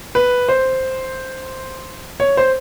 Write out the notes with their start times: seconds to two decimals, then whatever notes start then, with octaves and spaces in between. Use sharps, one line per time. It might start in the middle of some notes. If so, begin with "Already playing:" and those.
0.15 B4
0.49 C5
2.20 C#5
2.37 C5